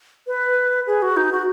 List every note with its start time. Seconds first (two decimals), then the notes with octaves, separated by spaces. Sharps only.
0.27 B4
0.87 G#4
1.02 F#4
1.17 D#4
1.32 F#4